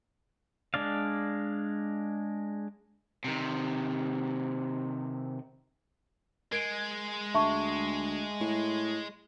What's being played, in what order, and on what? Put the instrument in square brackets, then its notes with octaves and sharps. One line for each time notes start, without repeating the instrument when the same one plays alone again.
[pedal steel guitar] G#3 D4 D5 F5
[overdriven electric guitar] C3 D#3
[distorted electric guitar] G#3 [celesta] A#4 G#6 D7
[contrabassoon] D2 [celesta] E5 A5 C#6
[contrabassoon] A2